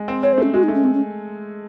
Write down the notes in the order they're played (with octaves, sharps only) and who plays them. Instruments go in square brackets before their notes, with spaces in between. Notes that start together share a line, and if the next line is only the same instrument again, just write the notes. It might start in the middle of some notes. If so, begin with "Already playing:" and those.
Already playing: [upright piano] G#3
C4
[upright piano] C4 [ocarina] C#5
[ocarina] C5
[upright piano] A3
[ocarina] C#4
[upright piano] G#3 [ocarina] F#4
[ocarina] D#4
[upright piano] A3
[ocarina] C#4
[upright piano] A3 [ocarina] C4
[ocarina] C#4